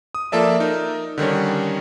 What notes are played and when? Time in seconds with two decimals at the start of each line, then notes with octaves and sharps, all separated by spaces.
0.15 D#6
0.32 F3 A#3 A4 D5 E5
0.60 D#4 A#4
1.18 D3 D#3 G3 C#4